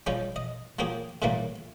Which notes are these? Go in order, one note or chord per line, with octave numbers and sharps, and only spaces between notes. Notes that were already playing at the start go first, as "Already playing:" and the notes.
F3 G3 G#3 C#4
D#5
F3 F#3 A#3 G4 G#4
A2 C#3 E3 F#3 G3 A#3